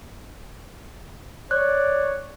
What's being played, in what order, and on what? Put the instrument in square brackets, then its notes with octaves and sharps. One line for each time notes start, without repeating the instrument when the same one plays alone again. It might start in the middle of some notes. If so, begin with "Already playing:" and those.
[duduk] C#5 [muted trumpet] D5 [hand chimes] F#6